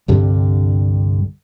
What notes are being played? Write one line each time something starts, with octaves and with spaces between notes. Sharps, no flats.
C2 G2 D3 G3